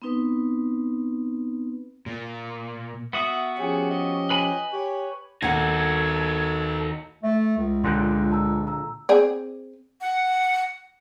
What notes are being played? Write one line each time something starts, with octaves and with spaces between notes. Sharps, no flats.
B3 C4 D#4 B4
A#2
B3 F#4 E5 D#6
F3 C#4 G4 G#4
D#5
B4 G#5 B5
G4 C#5
D#2 D#4 F#4 A4 F#5 G#6
A3 E5
C#2
A#2 D3 C6 F#6 G6
A5 A#5 E6
A#5 E6
C4 G#4 D5
F#5